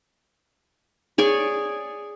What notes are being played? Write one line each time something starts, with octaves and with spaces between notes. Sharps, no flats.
G#4 C#5 D5 G#5